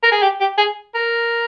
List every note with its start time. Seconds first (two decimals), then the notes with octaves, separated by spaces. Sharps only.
0.03 A#4
0.12 G#4
0.22 G4
0.41 G4
0.58 G#4
0.95 A#4